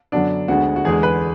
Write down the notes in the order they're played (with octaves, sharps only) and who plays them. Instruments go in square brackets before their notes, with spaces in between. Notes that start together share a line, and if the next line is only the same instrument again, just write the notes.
[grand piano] F#2 D3 F#3 B3 D4
D2 D3 G#3 B3 F#4
F#4
E2 D3 G#3 G#4
B4